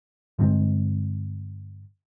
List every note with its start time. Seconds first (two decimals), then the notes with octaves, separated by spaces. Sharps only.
0.39 G2 D3 G#3 C4